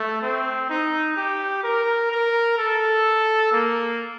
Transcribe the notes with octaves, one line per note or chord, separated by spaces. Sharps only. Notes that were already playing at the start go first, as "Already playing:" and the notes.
Already playing: A3
C4
D#4
G4
A#4
A#4
A4
A#3